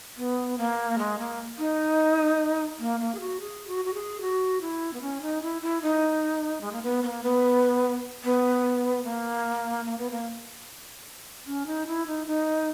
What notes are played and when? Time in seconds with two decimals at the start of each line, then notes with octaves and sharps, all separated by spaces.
0.17 B3
0.58 A#3
0.98 G#3
1.19 A#3
1.59 D#4
2.80 A#3
3.00 A#3
3.15 G#4
3.20 F#4
3.40 G#4
3.67 F#4
3.85 F#4
3.94 G#4
4.21 F#4
4.61 E4
4.93 B3
5.02 C#4
5.22 D#4
5.42 E4
5.62 E4
5.82 D#4
6.61 G#3
6.72 A#3
6.83 B3
7.03 B3
7.06 A#3
7.23 B3
8.24 B3
9.04 A#3
9.85 A#3
9.98 B3
10.11 A#3
11.47 C#4
11.67 D#4
11.87 E4
12.07 D#4
12.27 D#4